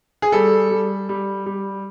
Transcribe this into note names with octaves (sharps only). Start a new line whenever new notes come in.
G#4
G3 A4
G3
G3
G3